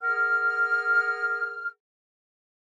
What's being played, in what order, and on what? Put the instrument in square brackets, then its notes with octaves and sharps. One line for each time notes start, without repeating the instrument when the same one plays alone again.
[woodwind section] G#4 A#4 F#5 F6